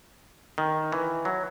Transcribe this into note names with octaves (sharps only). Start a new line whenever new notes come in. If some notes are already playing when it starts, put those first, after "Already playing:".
D#3
E3
F#3